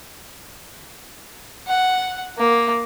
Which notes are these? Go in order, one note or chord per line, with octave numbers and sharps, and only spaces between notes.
F#5
A#3